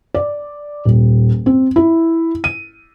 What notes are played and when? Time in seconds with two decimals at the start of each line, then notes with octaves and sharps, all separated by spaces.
0.15 D5
0.85 D#1
1.46 C4
1.76 E4
2.44 D#7